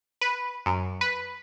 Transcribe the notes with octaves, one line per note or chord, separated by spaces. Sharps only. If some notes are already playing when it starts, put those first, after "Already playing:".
B4
F#2
B4